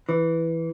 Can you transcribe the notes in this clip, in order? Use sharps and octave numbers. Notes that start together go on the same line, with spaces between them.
E3